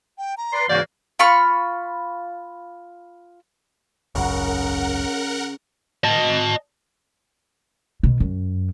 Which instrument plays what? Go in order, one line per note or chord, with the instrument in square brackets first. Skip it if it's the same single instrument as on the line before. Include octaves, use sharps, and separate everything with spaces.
[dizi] G5
A#5
[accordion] B4 D5 [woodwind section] C6
[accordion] G#2 C#3 F#4 [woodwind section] E3 A#3 [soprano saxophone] D5 [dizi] G6
[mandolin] F4 B5 C#6 F6
[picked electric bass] G#1 C#2 F#2 [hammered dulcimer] C#3 [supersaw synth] A#4 F#5
[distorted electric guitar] D#5 A5
[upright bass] B2
F#2